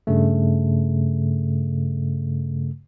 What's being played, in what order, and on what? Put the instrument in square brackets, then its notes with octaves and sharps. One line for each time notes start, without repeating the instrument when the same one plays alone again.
[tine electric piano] G2 C#3 A3